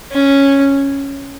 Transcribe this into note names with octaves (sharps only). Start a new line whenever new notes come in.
C#4